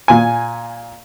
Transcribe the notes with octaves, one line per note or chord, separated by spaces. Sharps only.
A#2 G#5